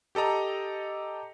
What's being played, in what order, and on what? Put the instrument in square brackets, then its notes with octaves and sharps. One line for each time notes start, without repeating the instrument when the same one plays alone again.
[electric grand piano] G4 A4 D#5 A#5